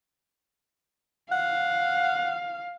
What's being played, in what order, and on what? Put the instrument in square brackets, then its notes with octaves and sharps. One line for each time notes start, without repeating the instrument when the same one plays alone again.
[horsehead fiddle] F5 [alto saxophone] F#5